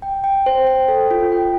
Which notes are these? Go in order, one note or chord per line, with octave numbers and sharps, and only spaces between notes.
G5
G5
C5
G5
A4
F4
G5